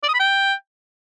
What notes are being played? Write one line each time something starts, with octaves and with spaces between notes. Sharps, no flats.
D5
D#6
B5
G5